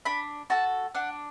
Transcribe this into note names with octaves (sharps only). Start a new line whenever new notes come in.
D4 B5
F#4 A4 A5
D4 F#5